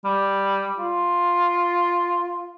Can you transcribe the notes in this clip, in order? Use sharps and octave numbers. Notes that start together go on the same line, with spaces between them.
G3
F4